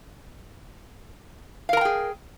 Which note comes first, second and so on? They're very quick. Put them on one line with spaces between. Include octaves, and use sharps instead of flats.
F5 A#4 A#5 G5 G#4